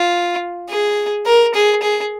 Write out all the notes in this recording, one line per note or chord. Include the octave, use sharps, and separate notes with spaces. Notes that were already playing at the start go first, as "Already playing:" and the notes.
Already playing: F4
G#4
A#4
G#4
G#4